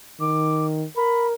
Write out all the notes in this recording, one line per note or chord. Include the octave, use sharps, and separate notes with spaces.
D#3 D6
A#4 B5